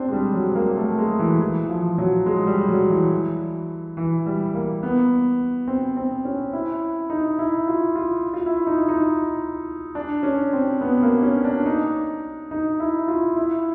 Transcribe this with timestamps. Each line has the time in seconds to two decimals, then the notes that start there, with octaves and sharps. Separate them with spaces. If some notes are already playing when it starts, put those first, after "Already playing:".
Already playing: C4 D4
0.08 G#3
0.13 G3
0.34 F#3
0.55 A#3
0.76 A3
0.98 G#3
1.19 E3
1.41 E3
1.69 F3
1.98 F#3
2.26 G#3
2.47 G3
2.69 F#3
2.90 E3
3.97 E3
4.26 G3
4.54 A#3
4.83 B3
5.67 C4
5.97 C4
6.25 C#4
6.53 E4
7.10 D#4
7.39 E4
7.68 F4
7.95 F4
8.34 F4
8.46 E4
8.67 D#4
8.89 D#4
9.95 D4
10.23 C#4
10.53 C4
10.81 B3
11.02 A#3
11.23 C#4
11.44 D4
11.66 D#4
12.51 D#4
12.80 E4
13.08 F4
13.36 E4